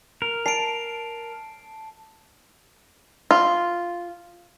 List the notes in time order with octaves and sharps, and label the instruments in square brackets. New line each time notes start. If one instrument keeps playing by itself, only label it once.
[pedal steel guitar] A#4
[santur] A5 [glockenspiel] C7 D7
[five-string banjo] F4